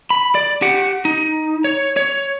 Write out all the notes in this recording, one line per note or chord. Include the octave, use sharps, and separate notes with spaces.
B5
D5
G4 F#5
D#4
C#5
C#5